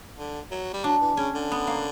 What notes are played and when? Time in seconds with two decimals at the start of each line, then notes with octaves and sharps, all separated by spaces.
0.17 D3
0.51 F#3
0.73 G3
0.84 F#3 D4
1.01 E3
1.17 C#3 C#4
1.35 D3
1.52 B3
1.67 A#3